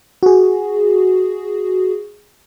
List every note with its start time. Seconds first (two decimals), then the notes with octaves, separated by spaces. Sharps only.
0.23 F#4 G#4